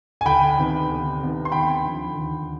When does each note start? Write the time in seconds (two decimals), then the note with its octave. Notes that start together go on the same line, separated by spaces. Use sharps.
0.21 G#5
0.25 D2 G5 B5
0.58 C3 D#3 B3
0.89 D2
1.20 C3 D#3 B3
1.45 C6
1.52 D#2 G5 B5
1.85 D3 F3
2.15 D#2